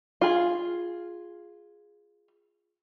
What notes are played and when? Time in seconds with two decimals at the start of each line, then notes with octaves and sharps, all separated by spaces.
0.21 F4 G#4